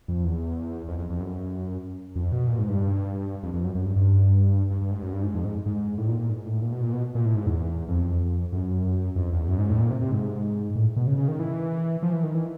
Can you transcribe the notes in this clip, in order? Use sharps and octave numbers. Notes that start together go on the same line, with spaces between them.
F2
E2
F2
F2
F2
F#2
F2
B2
A#2
G#2
G2
F2
F2
F#2
F#2
G2
G2
G2
G2
G#2
F#2
G2
G#2
F2
G#2
G#2
A2
A#2
A#2
G#2
A2
A#2
B2
A#2
B2
A#2
A2
G#2
E2
F2
F#2
F2
E2
F#2
G#2
A2
A#2
C3
C3
G#2
A2
B2
C#3
C#3
D#3
E3
F3
E3
D#3
E3